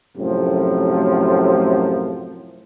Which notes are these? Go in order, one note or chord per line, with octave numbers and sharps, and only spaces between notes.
F#2 A2 C3 F3